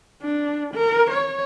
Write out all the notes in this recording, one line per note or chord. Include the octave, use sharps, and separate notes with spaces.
D4
A#4
C#5